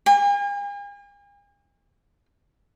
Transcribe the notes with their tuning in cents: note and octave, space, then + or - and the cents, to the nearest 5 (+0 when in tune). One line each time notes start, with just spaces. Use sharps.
G#5 -45